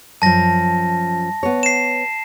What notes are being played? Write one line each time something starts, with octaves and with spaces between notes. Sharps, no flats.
F#2 F3 A5 A#6
B3 C#5
C7 E7